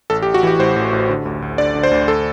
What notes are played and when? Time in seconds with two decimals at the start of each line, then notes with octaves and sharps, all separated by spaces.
0.10 A1 A4
0.22 G4
0.26 A1
0.34 F#4
0.43 E3 G4
0.59 A2 C5
0.76 A1
0.93 A1
1.10 D3
1.26 D2
1.42 D2
1.58 D3 D5
1.75 D3
1.83 C5
1.91 D2
2.08 A4